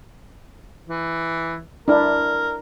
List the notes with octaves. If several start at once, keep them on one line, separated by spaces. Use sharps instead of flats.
E3
D4 E4 A#4